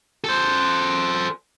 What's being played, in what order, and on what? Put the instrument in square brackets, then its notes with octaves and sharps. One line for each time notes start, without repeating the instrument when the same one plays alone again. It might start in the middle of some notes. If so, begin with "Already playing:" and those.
[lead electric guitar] A4 C5